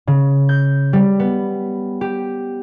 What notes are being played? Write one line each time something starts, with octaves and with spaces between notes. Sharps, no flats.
C#3
G6
G3
B3
G4